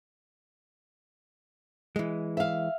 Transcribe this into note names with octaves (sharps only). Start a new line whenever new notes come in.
E3 G#3
E5 F5